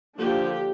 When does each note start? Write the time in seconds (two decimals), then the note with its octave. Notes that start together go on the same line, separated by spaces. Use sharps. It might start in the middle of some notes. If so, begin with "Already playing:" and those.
0.19 D3 F3 A#3 D4 G4